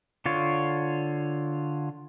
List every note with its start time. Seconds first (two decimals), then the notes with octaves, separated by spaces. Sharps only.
0.26 D3 F4 C#5